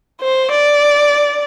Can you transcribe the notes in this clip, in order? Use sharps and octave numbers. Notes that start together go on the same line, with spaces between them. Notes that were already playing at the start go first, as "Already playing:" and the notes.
C5
D5